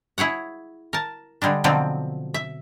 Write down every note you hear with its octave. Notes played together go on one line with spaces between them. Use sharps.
E4 G#4 C#5 F#5
A#4 A5
D3 G3 G#3 D4
B2 D3 F3 F#3 C4 D5
E5